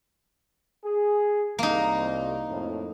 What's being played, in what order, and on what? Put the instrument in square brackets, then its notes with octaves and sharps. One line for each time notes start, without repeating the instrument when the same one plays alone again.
[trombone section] G#4
[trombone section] C2 [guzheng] A#3 D#4
[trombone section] F2 A2